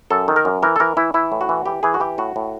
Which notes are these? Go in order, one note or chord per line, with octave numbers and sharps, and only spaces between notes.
F#2 A4
D#3
A#4
F#2
E3 A#4
A4
E3 A#4
E3 E4
E3 E4
A2
F#4
E3
E3 G4
E3 G#4
F#4
E3 G4
A2 F#4
A2